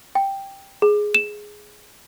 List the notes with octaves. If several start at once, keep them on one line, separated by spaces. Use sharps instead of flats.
G5
G#4
E7